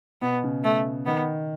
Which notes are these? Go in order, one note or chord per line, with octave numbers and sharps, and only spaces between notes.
B2 B3
C#3
A3
D#3 B3